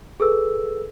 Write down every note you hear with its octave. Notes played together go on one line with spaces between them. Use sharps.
G#4 A4 B4 E6